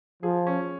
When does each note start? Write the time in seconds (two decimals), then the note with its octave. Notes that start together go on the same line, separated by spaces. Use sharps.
0.23 F3 G#4
0.47 C#4